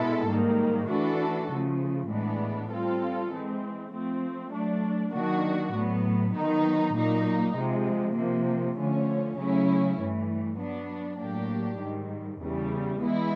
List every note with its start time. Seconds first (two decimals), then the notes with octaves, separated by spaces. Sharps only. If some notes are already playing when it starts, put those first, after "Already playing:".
Already playing: B2 G#3 B3 E4 A4
0.29 G#2 D#3 G3 A#3
0.89 E3 A3 D4 F#4 A4
1.50 C#3 F3 A3
2.10 A2 E3 G#3 B3 D4
2.71 G3 C4 F4 A4
3.32 E3 G#3 C4
3.92 F3 A3 C4
4.53 F#3 A3 D4
5.14 D#3 F#3 A#3 D4 F#4
5.74 A2 F#3 B3
6.36 D#3 F#3 B3 D#4
6.95 A#2 F#3 A#3 D#4
7.56 C3 F3 G#3
8.16 C3 F3 A#3
8.77 D3 F3 A3 C#4
9.38 C#3 F#3 A3 C#4 E4
9.98 G2 E3 A3
10.59 F#3 B3 D4
11.20 A2 F#3 A#3 D4 G4
11.80 G#2 D#3 G3
12.41 E2 C#3 E3 G3
13.02 E3 G#3 B3 E4